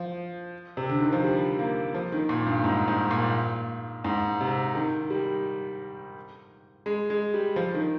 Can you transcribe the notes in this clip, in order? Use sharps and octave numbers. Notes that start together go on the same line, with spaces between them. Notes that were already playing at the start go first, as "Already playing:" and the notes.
Already playing: F3
C3
D3
D#3
F3
G3
A#3
F3
D#3
A#2
G2
G#2
G#2
A#2
G#2
C3
D#3
G3
G#3
G#3
G3
F3
D#3